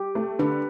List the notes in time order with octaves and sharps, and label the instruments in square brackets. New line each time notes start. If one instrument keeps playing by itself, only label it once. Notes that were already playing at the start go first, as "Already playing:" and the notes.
Already playing: [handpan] G4
[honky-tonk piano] A3
[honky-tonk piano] D3 [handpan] B4